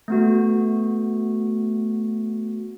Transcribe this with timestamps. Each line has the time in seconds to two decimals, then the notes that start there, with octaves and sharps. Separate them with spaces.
0.08 A3 B3 F#4